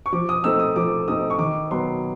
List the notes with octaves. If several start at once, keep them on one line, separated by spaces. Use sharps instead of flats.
C#6
F3 D6
D#6
A3 C4 D#4 E6
D#6
F3 D6
A3 C4 D#4 D#6
C#6
D#3 D6
F#3 B3 C6